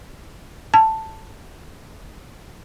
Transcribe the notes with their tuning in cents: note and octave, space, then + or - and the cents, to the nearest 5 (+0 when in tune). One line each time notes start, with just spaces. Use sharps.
A5 +5